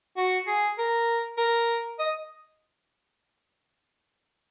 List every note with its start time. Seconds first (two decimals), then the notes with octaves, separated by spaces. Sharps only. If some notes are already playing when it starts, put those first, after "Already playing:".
0.17 F#4
0.47 G#4
0.78 A#4
1.37 A#4
1.99 D#5